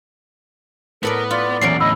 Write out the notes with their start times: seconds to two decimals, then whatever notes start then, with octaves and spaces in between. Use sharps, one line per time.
1.03 A2 B3 A4 A#4 D5
1.31 F4 D5
1.61 E2 A#2 E3 F#3 C#4 C7 D7
1.80 A2 D3 D#5 B5 E6